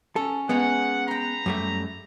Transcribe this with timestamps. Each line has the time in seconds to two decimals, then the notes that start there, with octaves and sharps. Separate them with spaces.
0.16 C#4 A4
0.49 G#3 A#3 B3 C#4 F#5
1.08 B4 G5 A#5 C6
1.46 F#2 G3 A3